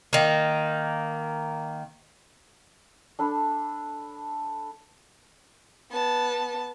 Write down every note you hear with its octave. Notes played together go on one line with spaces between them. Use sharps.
D#3 A#3
D4 A4 B5
B3 A5